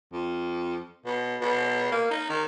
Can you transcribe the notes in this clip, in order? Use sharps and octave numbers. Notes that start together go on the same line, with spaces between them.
F2
B2
B2
A#3
D#4
D#3